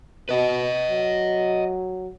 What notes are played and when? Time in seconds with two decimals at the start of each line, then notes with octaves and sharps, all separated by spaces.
0.29 B2 B4 D#5
0.90 F#3